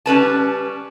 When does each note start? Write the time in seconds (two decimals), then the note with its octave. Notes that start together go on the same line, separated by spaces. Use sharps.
0.06 G3 C#4 B4 A5